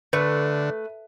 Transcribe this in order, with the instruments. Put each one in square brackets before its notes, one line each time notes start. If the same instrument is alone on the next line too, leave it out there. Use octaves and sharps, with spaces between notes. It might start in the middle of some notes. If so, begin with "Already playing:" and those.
[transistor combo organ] D3 [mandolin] A3 [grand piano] B4